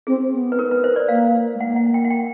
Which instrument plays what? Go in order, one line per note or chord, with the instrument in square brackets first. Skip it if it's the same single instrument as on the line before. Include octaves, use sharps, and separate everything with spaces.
[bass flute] C4 [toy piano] G#4
[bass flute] B3
[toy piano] B4
A#4
B4
C5
D5
[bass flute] A#3 [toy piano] F5
[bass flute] A3
[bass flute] A#3 [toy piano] F#5
[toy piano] F#5
G5
F#5
G5